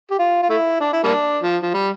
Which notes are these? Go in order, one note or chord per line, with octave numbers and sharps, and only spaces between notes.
G4
F4
F4
A3 E4
D4
E4
G3 A#3 D4
F3
F3
G3